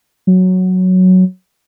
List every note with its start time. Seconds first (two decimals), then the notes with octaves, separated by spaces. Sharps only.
0.27 F#3